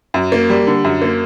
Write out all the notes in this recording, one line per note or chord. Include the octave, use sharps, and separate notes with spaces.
F#2
A#3
G3
D3
F#2
A#3